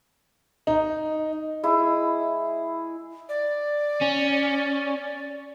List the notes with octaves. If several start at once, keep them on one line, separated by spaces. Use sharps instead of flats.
D#4
G#3 E4 G#4
D5
C#4